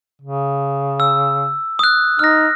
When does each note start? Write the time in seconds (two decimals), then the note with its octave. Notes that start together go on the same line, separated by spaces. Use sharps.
0.22 C#3
1.00 E6
1.79 D#6 F#6
2.19 D#4 F6 A#6